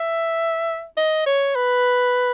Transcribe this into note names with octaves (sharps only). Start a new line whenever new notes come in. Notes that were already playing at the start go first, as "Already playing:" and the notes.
Already playing: E5
D#5
C#5
B4